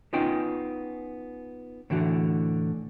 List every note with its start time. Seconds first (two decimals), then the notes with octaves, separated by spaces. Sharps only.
0.13 B3 C#4 D#4 F4 G5
1.90 A2 D3 E3 F#4